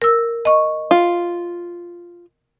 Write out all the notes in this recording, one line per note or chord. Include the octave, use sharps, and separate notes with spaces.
A#4 E6
D#5 C#6
F4